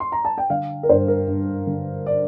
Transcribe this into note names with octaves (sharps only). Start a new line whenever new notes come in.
C6
A#5
A5
G5
D3 F5
A#4
G2 C5
A#4
G2
D3
D5